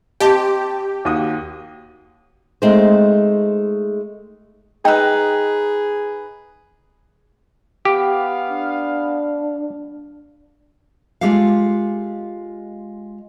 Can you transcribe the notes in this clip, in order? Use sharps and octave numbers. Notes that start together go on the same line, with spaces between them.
C4 G4 D#5 A5
D#2 F#4 D#6
G#3 A3 C4 D#4 C5
D#4 G#4 B4 G5 E6
B3 G4 F5
D4
G#3 F4 G4 A4 F5